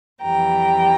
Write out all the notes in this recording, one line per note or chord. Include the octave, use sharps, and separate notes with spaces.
F2 E3 G3 G5 A#5